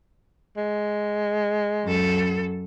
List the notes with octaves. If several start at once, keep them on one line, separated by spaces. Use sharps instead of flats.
G#3
F#2 A4